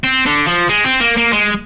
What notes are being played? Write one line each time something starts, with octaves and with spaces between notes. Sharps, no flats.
C4
D3
F3
G#3
C4
A#3
A#3
G#3